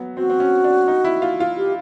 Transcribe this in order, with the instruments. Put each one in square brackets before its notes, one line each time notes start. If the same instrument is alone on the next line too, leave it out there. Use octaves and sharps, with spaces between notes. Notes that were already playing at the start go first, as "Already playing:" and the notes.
Already playing: [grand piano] F#3 B3
[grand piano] C4 [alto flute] F#4
[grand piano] C4
C#4
D4
D#4
E4
F4
F4
[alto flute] G4